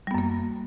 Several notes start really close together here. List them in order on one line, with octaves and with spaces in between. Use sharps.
G3 B3 F#2 A#3